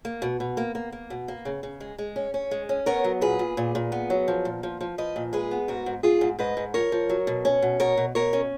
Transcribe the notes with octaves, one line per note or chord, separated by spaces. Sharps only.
A#3
B2
B2
A#3
A#3
A#3
B2
A#3
C#3
C#3
G#3
G#3
C#4
C#4
G#3
C#4
B3 A#4 C#5
F#3
A#2 G#4 B4
A#2
A#2
A#2
B3
F#3
F3
A#2
F3
F3
F3 B4 D#5
A#2
G#3 G#4 B4
B3
G#2 F#4 A#4
G#2
G#2 F4 G#4
G#2
G#2 B4 D#5
G#2
F3 A#4 C#5
F3
F#3
B2
C#4
B2
B2 A#4 C#5
B2
B2 A#4 C#5
C#4